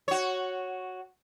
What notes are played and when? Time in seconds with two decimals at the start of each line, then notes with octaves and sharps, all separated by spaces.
0.08 F#4 C#5